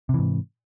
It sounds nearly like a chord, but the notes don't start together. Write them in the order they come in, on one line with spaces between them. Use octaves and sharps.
C3 E3 G#2